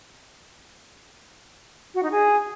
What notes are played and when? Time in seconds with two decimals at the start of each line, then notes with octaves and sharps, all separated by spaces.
1.94 F#4
2.03 D#4
2.12 G#4